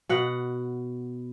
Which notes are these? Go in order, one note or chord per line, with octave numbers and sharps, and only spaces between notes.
B2 F#5